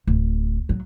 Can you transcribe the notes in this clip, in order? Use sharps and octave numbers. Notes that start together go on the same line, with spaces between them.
D1
F#3